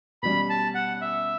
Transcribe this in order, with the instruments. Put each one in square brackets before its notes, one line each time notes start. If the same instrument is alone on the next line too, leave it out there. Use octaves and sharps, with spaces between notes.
[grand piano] B2 G3 C#4 [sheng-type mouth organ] B5
[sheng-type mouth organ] A5
F#5
E5